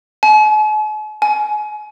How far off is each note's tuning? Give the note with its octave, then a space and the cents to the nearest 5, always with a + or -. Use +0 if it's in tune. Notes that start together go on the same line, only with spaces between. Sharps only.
G#5 +45
G#5 +30